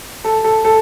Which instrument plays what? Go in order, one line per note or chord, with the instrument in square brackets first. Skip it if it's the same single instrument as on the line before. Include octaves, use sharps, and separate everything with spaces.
[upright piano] A4
A4
A4